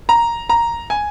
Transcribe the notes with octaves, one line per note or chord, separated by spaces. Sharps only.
A#5
A#5
G#5